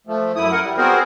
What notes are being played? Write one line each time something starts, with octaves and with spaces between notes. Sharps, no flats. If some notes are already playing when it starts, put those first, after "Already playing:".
F3 A3
F#2 E4 D#6
A#4 F#5
G3
B3 C4 F#4 G#4 A#4 C5